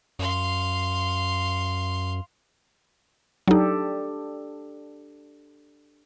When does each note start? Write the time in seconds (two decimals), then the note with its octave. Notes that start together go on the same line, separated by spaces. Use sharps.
0.19 F#2 F5 C6
3.48 F#3 D4 D#4 G4 A4